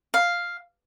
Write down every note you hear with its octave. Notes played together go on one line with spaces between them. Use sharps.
F5